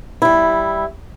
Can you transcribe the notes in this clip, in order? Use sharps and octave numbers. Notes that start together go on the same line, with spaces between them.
G3 E4